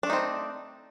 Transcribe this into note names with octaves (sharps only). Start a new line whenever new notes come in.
A3 C4 D4 D#4